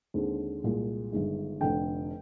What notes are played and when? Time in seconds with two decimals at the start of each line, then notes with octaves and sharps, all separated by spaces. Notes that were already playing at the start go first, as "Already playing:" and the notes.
0.14 D#2 D3 G#3 C4
0.63 C2 A#2 G#3
1.12 G1 G2 D#3 G#3
1.61 F1 F2 D3 G5